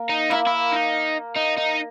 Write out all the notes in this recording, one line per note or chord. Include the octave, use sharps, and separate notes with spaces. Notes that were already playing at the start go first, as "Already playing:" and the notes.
Already playing: A#3
D#4
A#3 E4
E4
D#4
D#4
D#4